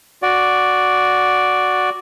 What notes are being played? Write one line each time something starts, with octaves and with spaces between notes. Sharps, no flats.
F#4 D5